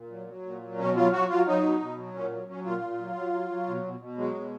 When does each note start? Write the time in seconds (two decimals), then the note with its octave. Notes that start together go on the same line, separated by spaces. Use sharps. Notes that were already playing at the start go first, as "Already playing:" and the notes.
Already playing: A#2
0.10 F#3
0.27 F#3
0.45 A#2
0.61 F#3
0.78 B2 C#4
0.96 F#3 F4
1.12 F#3 F#4
1.29 F#3 F4
1.47 F#3 D#4
1.63 B2
1.80 B2
1.98 F#3
2.15 A#2 C#4
2.31 F#3
2.48 F#3 C#4
2.66 A#2 F4
2.82 A#2
2.99 F#3
3.15 F#3
3.33 F#3
3.50 F#3
3.67 B2
3.83 B2
4.00 B2
4.17 F#3 G#3
4.35 B2